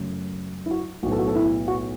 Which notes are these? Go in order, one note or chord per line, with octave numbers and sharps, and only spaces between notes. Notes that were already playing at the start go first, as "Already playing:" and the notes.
Already playing: F#2 C#3 A3
E4
F#4
B1 A2 F#3 B3 F#4
A4
F#4
A4
E4
F#4